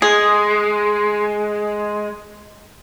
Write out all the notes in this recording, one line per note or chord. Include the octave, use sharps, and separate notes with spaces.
G#3 G#4